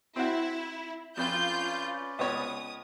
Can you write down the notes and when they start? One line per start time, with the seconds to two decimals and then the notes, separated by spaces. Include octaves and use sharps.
0.16 C4 E4 F#4
1.17 F2 C#4 F4 B4 D5 G6
2.19 C#2 B3 C#5 D#6